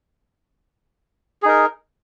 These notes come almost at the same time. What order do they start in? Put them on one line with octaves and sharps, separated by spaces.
G#4 D#4 A#4